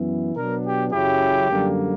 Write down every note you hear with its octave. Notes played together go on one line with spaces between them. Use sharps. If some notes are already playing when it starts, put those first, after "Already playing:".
Already playing: F#2 E3 B3 E4
B2 F#3 B3 D4 A#4
G4
F#2 C#3 F#3 C#4 E4 G4
F#2 D3 G3 A#3